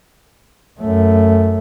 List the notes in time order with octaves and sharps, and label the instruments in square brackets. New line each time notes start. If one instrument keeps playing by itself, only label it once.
[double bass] F#2 A3